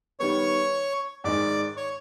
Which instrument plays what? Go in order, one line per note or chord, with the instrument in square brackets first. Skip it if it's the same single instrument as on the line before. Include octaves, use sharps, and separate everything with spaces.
[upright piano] D#3 G3 B3 [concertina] C#5 C#6
[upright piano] G#2 D#3 G#3 [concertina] D5 D6
[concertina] C#5 C#6